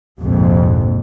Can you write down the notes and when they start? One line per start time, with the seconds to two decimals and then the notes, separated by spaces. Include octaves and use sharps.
0.21 A#1 F2 G#2 C3